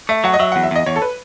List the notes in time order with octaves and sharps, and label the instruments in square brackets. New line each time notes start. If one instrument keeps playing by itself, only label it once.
[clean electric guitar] A3 [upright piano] E5
[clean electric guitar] F#3 [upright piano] F#5
[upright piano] D#5
[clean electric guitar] F#3 [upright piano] E5
[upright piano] F#5
[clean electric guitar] E2
[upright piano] E5
[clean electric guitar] E2 [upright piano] D#5
[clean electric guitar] E2 [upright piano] C#5
[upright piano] A4
B4